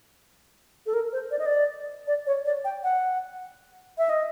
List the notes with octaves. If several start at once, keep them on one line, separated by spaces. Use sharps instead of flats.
A4
A#4
C5
D5
D#5
D5
D5
C#5
D5
G5
F#5
E5
D#5